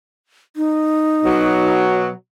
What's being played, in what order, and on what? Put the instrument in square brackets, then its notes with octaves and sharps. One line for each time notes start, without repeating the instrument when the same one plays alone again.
[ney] D#4
[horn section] B2 F#3